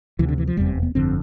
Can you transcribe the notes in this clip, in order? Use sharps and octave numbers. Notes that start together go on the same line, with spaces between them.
D2 C3 E3
D3
E3
F3
F1 E2 C3 G3
B3
G1 F2 D3 C4